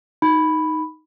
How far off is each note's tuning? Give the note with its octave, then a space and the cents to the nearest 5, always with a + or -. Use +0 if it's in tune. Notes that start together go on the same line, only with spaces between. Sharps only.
D#4 +0 B5 +0